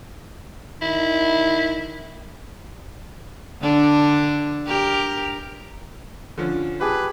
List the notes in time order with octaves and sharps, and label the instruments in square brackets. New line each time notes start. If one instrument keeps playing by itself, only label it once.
[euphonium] D#3 [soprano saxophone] E4
[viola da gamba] D3 D4
G4 A#4
[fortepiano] D3 F3 C#4
[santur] G4 G#4 A5 [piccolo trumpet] B4